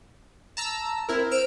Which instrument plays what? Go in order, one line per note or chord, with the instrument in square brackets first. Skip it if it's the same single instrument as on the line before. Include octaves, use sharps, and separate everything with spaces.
[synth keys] A5 A#5 E6
C4 E4 A#4
[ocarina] C5 [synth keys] E6 F6 D7